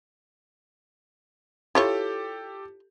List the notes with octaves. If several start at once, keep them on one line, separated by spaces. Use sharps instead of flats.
E4 F4 G4 A4 C#5